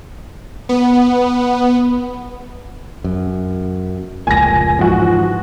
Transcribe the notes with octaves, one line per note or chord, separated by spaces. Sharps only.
B3
F#2
F1 C#2 A#2 G#5 A#6
G#2 E3 F3 F#4